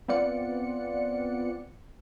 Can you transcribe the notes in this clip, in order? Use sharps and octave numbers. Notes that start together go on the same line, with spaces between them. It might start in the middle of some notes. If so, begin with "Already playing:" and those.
B3 C4 F4 D5 F#5 C#7